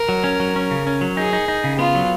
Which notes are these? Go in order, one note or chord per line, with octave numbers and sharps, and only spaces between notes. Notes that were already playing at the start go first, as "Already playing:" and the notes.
Already playing: A#4
F#3
C#4
F#3
C#4
C#3
C#4
F#3
D#4 G#4
D#4
D#4
C#3
B3 F4
F#3